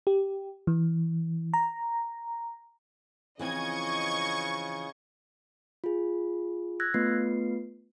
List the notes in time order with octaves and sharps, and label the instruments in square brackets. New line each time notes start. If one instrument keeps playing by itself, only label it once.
[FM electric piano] G4
E3
A#5
[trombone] C#3 [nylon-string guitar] E3 F3 C4 [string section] D#5 G#6 [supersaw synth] C#6
[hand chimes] F4 G#4
E6 F#6 G#6 A#6
A3 B3 F4 B4 C7